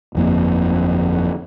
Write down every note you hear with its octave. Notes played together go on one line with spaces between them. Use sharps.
G1 F2 A#3